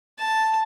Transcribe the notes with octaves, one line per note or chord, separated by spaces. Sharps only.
A5